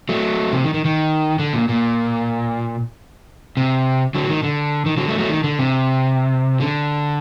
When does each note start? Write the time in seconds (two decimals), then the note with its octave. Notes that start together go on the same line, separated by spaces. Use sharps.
0.09 F#3 A3
0.52 C3
0.64 D#3
0.74 D#3
0.85 D#3
1.39 D3
1.53 A#2
1.69 A#2
3.57 C3
4.14 D3 F#3
4.29 D#3
4.43 D3
4.86 D#3
4.97 D3 F#3
5.08 F#3 A3
5.18 F#3 A3
5.29 D#3
5.44 D3
5.59 C3
6.60 D3